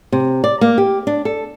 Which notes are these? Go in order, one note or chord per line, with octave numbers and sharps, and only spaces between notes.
C3
D5
A#3
G4
D4
A4